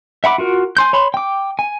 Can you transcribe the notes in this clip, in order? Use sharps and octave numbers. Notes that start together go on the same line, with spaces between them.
E5 F#5 B5 D6
F4 F#4 A#4
G#5 C6 G6
C#5 B5 C6
G5 D6
G#5